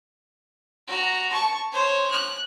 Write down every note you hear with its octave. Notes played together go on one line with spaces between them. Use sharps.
F#4 A#5
A5 C#6
C5 C#5
F#6